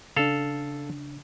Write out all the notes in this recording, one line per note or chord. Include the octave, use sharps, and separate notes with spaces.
C#3 D4 A4 F5